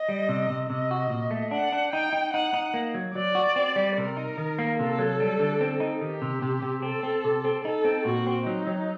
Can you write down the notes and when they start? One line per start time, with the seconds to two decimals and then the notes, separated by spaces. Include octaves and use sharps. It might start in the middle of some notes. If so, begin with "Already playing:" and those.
Already playing: D#5
0.09 G3
0.29 C3
0.50 C3
0.70 C3 D#5
0.91 F#4
1.10 A#2
1.31 A3
1.51 D4 F#5
1.72 D4
1.93 D#4 G5
2.13 D#4
2.33 D#4 F#5
2.54 D#4
2.74 A#3
2.94 F#3
3.15 F#3 D5
3.35 F#4
3.56 C4
3.76 G3
3.97 C3 A#4
4.17 D#4
4.38 D#3
4.59 A#3
4.79 C3 A4
4.99 F#3
5.20 G3
5.40 D3
5.61 C4
5.80 D#4
6.01 D#3 G4
6.22 C3
6.42 C3
6.62 C3
6.82 C4 A4
7.03 C4
7.24 C3
7.45 C4
7.64 D#4 A4
7.85 C4
8.05 A#2 F#4
8.27 C4
8.46 F#3 D#4
8.67 F#3